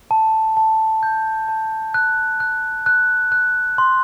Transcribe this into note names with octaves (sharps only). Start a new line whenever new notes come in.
A5
A5
G6
A5
F#6
F#6
F#6
F#6
C6